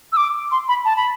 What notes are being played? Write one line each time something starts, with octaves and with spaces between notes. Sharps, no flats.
E6
D6
C6
B5
A5
B5